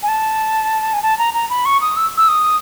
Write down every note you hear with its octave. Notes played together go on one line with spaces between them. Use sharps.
G#5
A5
G#5
A5
A#5
A#5
B5
C#6
D#6
E6
E6
D#6